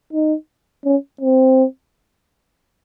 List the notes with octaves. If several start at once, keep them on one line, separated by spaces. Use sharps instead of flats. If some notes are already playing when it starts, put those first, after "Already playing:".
D#4
C#4
C4